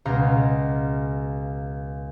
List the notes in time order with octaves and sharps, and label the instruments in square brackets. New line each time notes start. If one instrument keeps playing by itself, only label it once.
[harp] C#2 B2 F5 A#5